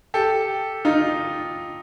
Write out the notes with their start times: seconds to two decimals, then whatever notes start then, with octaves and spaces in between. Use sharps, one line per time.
0.14 G4 A4
0.85 D#4 F4